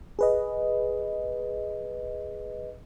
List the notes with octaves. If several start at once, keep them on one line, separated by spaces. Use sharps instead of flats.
G#4 B4 D#5